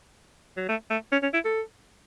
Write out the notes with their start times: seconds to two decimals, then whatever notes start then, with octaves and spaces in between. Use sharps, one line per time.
0.57 F#3
0.69 A3
0.90 A3
1.12 C#4
1.23 C#4
1.34 E4
1.45 A4